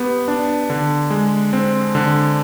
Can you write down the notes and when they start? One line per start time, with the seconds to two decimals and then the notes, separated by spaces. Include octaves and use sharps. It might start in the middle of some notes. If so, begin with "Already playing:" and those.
Already playing: B3 G4
0.28 D4
0.70 D3
1.10 G#3
1.53 C4
1.95 D3